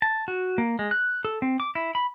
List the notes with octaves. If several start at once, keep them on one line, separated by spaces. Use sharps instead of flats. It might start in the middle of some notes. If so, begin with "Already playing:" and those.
A5
F#4
A#3
G#3
F#6
A4
C4
D6
E4
B5